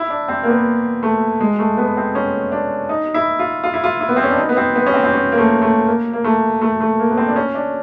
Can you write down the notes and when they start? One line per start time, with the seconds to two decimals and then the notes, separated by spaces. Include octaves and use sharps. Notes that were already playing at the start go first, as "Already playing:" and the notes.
Already playing: E4
0.10 D4
0.28 C4
0.43 A#3
0.48 B3
1.03 A3
1.40 G#3
1.59 A3
1.77 B3
1.97 C4
2.15 C#4
2.52 D4
2.89 D#4
3.14 E4
3.39 F4
3.64 F4
3.74 E4
3.84 F4
4.01 E4
4.09 B3
4.16 C4
4.23 C#4
4.31 D4
4.38 D#4
4.49 B3
4.57 C4
4.76 B3
4.86 C#4
4.94 C4
5.04 C4
5.13 C#4
5.32 A#3
5.38 A3
5.62 A3
5.87 A#3
6.13 A#3
6.24 A3
6.62 A3
6.81 A3
6.99 A#3
7.10 B3
7.17 C4
7.28 D4
7.36 C#4
7.55 D4